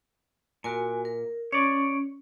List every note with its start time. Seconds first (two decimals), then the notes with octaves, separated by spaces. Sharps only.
0.64 A#2 F#4 A#4 G#5
1.05 A#4
1.52 C#4 C#5 D5